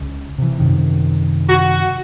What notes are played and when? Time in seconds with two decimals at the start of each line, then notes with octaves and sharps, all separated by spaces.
0.01 C#2
0.38 C3 E3
0.59 F#2 C3 D#3
1.49 F#4